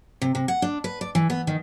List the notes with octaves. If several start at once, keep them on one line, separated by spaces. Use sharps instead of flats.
C3
C3
F#5
D4
B4
D5
E3
B3
D#3